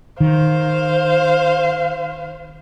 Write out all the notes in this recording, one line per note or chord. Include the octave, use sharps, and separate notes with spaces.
D#3 C5 F5